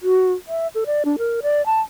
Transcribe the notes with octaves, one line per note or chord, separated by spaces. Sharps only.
F#4
E5
A4
D5
D4
A#4
D5
A5